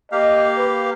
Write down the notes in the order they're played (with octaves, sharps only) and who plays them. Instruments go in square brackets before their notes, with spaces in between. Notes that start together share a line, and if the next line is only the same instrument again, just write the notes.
[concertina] A#3 G4 F5 [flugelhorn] D#5
[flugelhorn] B4